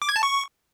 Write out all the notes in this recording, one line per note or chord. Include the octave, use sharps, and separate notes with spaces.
D6
G#6
A5
C#6